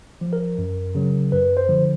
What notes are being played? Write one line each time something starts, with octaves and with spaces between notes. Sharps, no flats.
F3
A#4
F#2
C#3 F#3
F#2 B4
C5
D3 F3